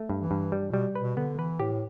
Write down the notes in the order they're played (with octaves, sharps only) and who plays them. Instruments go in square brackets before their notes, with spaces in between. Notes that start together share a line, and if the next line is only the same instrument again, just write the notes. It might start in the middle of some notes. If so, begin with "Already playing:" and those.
Already playing: [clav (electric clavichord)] A3
G2
[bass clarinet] E3
[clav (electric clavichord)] G2
G3
[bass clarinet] B2 [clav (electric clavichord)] G3
[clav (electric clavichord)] B4
[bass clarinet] B2
[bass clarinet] D3 [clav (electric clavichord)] B3
[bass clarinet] E3 [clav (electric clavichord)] B4
[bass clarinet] A2 [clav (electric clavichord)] G4